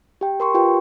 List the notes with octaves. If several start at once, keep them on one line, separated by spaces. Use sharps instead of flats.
G4 G5
A#4 C6 C#6
F4 G4 B4 G5